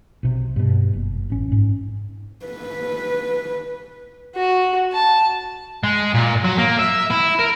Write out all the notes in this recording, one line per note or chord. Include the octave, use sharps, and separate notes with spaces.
B1 C3
G2 B2
F#1
A1 C#4
G#2 C#4
B4
F#4
A5
G#3
A#2
F#3
A#3
E5
E4
A#4